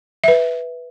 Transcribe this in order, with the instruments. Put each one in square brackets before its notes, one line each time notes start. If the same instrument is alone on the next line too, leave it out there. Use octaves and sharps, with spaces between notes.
[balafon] B4 E5